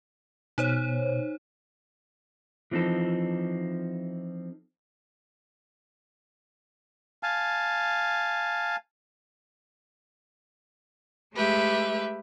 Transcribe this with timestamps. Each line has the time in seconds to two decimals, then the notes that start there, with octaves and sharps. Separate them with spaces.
0.58 B2 D#4 C5 C#5
2.71 E3 F3 C4 D#4 A4
7.23 F5 G#5 A5
11.36 G#3 A3 G4 B4 E5